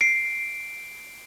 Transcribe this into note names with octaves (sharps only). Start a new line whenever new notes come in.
C7 D7